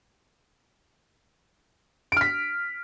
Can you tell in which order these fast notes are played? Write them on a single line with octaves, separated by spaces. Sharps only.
D7 F6 B6